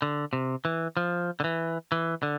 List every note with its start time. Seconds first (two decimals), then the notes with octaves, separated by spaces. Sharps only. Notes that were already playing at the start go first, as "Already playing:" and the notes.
0.02 D3
0.33 C3
0.65 E3
0.97 F3
1.40 D3
1.44 E3
1.92 E3
2.23 D3